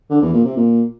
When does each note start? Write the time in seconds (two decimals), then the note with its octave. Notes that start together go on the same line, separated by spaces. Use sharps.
0.10 D3
0.22 E2
0.33 A#2
0.45 C3
0.56 A#2